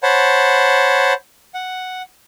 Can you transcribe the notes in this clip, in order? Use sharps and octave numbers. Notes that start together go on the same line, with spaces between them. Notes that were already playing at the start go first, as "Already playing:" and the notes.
C5 C#5 F#5 A5 B5
F#5